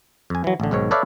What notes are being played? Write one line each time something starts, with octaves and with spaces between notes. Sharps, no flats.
F2 G#5
E3 F#3
A1 D3
B1 G#2 D#3 C#5
A4 B4 C#5 D5 E5 F5